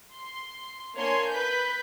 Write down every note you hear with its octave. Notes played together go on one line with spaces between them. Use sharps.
C6
A#3 D4 C#5 G#5 C6
B4 G6 B6